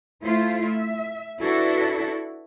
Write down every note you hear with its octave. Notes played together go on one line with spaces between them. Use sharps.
A3 E4 F4 C5
E5
D4 E4 F#4 A4 B4